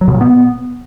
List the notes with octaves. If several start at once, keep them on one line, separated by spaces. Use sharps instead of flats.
F#3
B2
A#2
B3